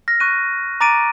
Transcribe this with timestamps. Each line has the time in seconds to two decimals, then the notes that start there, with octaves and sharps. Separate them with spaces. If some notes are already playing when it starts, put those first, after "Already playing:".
0.08 F6 A#6
0.20 C#6 F#6 D#7
0.81 A#5 D6 A6 D7 D#7